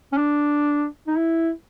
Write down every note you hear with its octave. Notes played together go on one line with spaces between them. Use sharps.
C#4
D4
D#4
E4